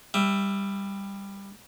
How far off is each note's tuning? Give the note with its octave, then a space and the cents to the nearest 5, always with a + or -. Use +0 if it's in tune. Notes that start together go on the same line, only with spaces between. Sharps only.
G3 +15 E5 +0